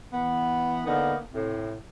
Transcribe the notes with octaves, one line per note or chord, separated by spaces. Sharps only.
E3 B3
D3 A#3 B3 D#4
A2 C3